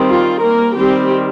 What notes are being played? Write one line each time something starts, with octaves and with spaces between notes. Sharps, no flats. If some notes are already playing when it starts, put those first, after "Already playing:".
Already playing: D#3 G3 C4
F4
A#3 A#4
D#3 G3 C4 G4